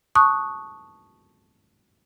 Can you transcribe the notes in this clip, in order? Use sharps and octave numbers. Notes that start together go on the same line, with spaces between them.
A5 C#6 D#6 F#6